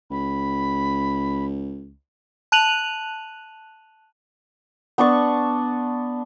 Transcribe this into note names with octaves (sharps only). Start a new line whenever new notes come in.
C#2 B5
A5 F#6 D#7 F7 F#7
B3 D4 A5 C#6